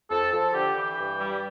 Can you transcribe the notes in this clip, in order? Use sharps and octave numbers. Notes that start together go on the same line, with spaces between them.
F2 A4
F3 A4
D3 G4
E3 G4
G2
G3